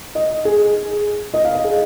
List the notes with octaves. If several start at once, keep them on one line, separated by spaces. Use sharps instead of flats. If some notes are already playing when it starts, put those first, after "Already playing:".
D#5
G#4
D#5
F5
D#5
G#4